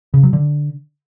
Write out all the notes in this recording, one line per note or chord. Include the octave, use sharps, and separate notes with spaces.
C#3
F#3
D3